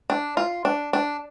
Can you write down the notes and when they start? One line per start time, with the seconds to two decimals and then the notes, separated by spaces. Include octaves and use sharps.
0.10 D4
0.37 F4
0.65 D4
0.93 D4